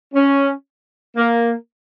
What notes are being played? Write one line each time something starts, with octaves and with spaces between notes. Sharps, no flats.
C#4
A#3